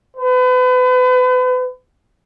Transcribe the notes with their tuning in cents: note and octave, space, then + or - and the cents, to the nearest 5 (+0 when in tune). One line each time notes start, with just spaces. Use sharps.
B4 +35